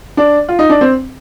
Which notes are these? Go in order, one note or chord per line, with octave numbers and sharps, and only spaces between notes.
D4
F4
D#4
D4
C4